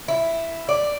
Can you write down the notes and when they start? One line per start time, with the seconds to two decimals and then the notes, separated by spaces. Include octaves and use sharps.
0.08 E4
0.69 D5